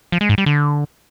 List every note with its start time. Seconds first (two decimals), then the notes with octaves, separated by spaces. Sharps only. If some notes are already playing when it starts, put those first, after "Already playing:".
0.12 F3
0.21 G#3
0.29 G#2
0.38 G3
0.46 D3